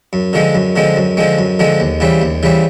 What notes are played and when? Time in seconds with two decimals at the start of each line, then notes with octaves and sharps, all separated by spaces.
0.13 F#2
0.33 D3 F3 G#3 C4
0.55 F#2
0.76 D3 F3 G#3 C4
0.96 F#2
1.17 D3 F3 G#3 C4
1.39 F#2
1.59 D3 F3 G#3 C4
1.80 D#2
2.00 C#3 E3 G3 C4
2.22 D#2
2.43 C#3 E3 G3 C4